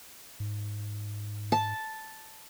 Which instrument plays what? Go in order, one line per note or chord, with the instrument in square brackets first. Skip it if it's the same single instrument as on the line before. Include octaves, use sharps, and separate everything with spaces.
[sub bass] G#2
[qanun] A5